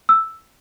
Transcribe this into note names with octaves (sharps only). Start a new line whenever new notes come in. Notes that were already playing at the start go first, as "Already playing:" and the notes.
E6